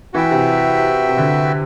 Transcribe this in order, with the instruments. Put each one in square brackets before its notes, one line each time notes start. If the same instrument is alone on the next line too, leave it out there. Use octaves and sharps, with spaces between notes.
[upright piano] E3 [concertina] F#4 B4 E5 G5
[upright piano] C3
C3
D3